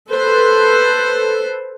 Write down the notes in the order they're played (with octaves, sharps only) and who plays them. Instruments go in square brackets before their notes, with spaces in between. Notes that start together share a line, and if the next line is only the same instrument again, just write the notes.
[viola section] A4 B4 C5